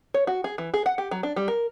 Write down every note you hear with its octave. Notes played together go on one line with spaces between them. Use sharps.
C#5
F#4
G#4
E3
G#4
F#5
G4
F#3
D4
G3
A#4